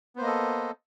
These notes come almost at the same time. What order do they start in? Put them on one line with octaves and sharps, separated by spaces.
B3 C5 A#3 D#5 A4